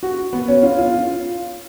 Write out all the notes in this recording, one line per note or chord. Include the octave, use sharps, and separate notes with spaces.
F#4
B3
C#4
F4
F4
F4